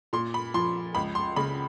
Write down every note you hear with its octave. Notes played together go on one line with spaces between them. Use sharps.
A#2 C6
B5
F3 C6
C#2 B5
C6
C#3 B5